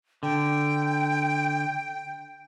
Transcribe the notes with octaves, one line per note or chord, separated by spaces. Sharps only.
D3 G5